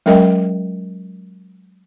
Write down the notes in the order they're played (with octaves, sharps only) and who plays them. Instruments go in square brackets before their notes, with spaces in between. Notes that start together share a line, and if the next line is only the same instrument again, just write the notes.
[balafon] F#3 G#3 C#4 A#4 D#5 G5